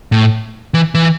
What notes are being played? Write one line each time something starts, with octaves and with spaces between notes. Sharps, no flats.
A2
E3
E3